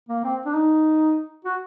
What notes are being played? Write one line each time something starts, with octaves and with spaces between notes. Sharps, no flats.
A#3
C4
D4
D#4
F#4